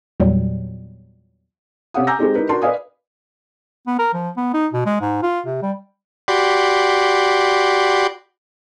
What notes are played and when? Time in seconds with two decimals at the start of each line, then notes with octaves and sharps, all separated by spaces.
0.20 E2 A#2 F#3 G3
1.94 C3 C#4 G4 F5 F#5 D#6
2.07 G#5 A#5 D6 E6 G6 A#6
2.19 G#3 C4 D#4 G4
2.35 D#4 E4 G4 A#4 B4
2.49 D4 F#4 A#4 A5 C6
2.62 B4 D5 D#5 F5 G#5 D#6
3.87 B3
3.99 A#4
4.13 F3
4.37 B3
4.54 D#4
4.73 B2
4.86 G#3
5.01 G#2
5.23 F4
5.46 C3
5.62 G3
6.28 F#4 G4 D5 B5 C6